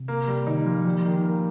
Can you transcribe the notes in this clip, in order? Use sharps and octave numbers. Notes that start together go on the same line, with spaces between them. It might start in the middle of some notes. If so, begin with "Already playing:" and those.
Already playing: C3
A#3
G3
D#3 D#4
A#2 F3
F3 G3
D#3
A#3